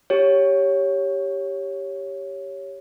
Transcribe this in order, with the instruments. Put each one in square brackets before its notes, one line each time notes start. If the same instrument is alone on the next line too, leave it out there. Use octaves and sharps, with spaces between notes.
[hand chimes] G4 C#5